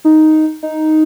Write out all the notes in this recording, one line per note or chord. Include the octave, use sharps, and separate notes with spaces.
D#4
D#4